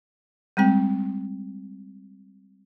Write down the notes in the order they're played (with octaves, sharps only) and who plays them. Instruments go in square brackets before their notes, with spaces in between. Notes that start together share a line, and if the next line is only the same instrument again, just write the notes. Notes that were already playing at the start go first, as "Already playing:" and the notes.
[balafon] G3 G#3 C4 G5